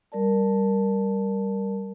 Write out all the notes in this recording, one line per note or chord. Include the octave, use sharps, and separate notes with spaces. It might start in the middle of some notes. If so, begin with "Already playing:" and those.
G3 A#4 D5 A5